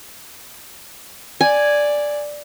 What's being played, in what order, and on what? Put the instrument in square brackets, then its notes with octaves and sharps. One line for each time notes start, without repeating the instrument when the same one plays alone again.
[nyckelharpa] D5 [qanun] G#5